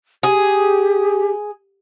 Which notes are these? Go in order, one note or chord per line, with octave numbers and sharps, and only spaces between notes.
G4 G#4